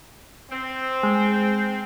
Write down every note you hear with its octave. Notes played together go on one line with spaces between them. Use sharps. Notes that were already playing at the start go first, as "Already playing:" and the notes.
C4
G#3